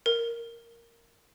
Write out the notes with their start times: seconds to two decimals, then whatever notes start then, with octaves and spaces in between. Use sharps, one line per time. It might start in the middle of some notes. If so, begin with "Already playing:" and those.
0.06 A#4